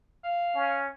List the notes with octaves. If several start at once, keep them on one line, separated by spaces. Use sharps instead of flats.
F5
C#4